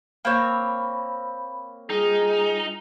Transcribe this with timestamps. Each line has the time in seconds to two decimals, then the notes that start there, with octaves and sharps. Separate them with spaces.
0.25 A#3 C4 C#5 B5
1.90 G3 D#4 F4 G#4